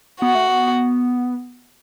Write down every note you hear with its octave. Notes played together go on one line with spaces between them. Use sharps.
B3 F#4
A3
B3